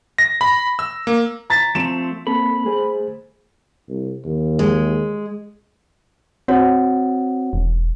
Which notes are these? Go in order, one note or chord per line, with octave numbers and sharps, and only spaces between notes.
A#6
B5
E6
A#3
A#5 A6 B6
F3 A3 C4 E7
A#3 C4 A4 B5
A3 G#4 C5
C2
D#2
G#3
C4 F#4 C#5 F#5
E1